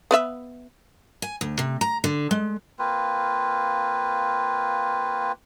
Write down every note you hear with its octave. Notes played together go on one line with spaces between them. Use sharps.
B3 B4 E5
G#5
D2
C3
A#5
D3
G#3
A#3 C4 F4 B4